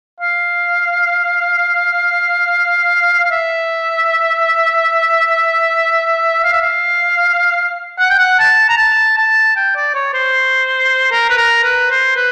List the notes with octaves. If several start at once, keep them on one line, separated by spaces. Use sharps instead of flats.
F5
F5
E5
F5
E5
F5
F#5
G5
F#5
A5
A#5
A5
A5
G5
D5
C#5
C5
A#4
B4
A#4
B4
C5
B4